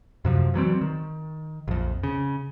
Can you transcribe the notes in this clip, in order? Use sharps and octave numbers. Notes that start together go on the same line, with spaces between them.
F#2 C3 F3
E3 F#3 G3 C4
D#3
A#1 F2
C#3